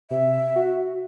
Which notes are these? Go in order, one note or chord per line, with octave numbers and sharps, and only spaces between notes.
C3 E5
F#4